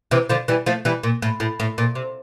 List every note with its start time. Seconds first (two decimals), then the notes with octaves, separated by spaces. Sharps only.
0.11 C3 E3
0.29 D3 F3
0.48 E3 G3
0.66 F3 A3
0.85 E3 G3
1.03 A#2
1.22 A2
1.40 A2
1.60 A2
1.78 A#2
1.95 C3